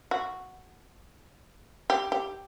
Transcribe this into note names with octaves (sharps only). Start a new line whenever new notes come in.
F#4
G4
G4